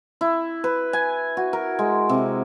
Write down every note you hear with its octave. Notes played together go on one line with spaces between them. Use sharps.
E4
B4
G#5
F#4
A#4
G#3
C3